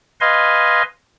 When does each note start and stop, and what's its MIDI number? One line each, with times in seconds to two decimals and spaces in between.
0.21 0.83 71
0.21 0.83 75
0.21 0.83 77
0.21 0.83 80
0.21 0.83 84